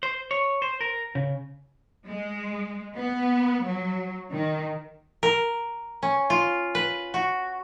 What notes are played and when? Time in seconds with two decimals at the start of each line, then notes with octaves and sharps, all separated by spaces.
0.03 C5
0.31 C#5
0.62 C5
0.81 A#4
1.15 C#3
2.09 G#3
2.95 B3
3.64 F#3
4.32 D#3
5.23 A#4
6.03 C#4
6.30 F4
6.75 B4
7.14 F#4